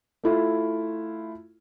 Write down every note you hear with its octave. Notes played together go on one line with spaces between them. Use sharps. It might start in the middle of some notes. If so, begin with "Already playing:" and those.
A3 E4 F4